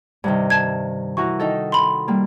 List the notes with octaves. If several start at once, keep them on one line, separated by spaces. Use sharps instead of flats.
G2 C3 D#3
A5 G#6
E3 F#4 A#4 C#6
D#3 D#4 A4
B5 C6
G3 A#3